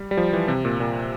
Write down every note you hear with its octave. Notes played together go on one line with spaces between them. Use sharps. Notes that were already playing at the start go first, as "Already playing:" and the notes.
Already playing: G3
G3
F3
E3
C3
A#2
A#2